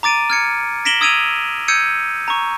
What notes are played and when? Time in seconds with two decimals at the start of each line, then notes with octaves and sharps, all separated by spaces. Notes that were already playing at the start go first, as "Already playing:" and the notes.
0.03 A#5 D6 A6 D7 D#7
0.30 F6 G#6 C#7
0.85 A#6 B6 D7 E7 F#7 G7
1.01 D#6 E6 G#6 D7 D#7 F7
1.68 E6 G6 G#6 C#7 D#7
2.28 A#5 C#6